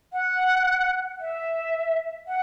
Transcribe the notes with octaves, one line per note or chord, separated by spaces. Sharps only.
F#5
E5
F#5